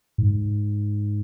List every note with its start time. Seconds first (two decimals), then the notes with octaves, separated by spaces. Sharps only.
0.18 G#2